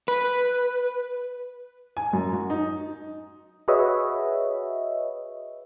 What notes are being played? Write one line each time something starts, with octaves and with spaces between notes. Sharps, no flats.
B4
G#5
F#2
F#4
D#4
F#4 G#4 B4 C#5 D#5 E5